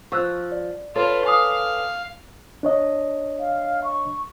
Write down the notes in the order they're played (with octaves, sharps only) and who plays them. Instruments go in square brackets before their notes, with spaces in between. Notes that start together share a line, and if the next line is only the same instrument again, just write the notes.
[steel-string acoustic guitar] F3 [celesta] C#6 E6 F#6
[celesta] D5
[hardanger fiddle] F4 [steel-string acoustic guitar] A4 B4 C#5
[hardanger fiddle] F5 [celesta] G#5 D6 D#6
[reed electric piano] D4 C#5 D#5
[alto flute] F5
C#6